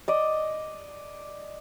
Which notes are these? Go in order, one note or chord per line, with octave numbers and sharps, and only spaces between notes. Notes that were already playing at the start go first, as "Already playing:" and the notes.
D5 D#5